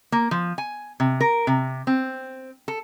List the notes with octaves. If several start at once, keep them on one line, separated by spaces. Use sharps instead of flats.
A#3
F3
G#5
C3
A#4
C3
C4
A4